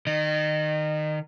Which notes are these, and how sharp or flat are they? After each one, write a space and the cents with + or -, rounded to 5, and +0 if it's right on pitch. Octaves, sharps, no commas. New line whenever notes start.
D#3 -15 D#5 -30